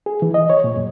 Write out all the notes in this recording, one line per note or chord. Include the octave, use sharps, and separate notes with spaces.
G#4
E3
D#5
C#5
A#2
F#2